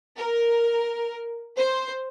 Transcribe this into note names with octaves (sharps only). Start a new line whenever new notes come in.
A#4
C5